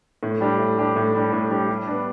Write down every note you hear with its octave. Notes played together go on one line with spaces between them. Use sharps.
A2
G3 D4 G4
A2
G3 D4 G4
A2
G3 D4 G4
A2
G3 D4 G4
G3
B3 D4